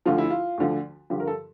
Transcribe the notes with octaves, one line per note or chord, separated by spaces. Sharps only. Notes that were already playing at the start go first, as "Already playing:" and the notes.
D2 D3 F3 F4
E4
F4
D2 D3 F3
G2 D3 F3 G4
A#4
A4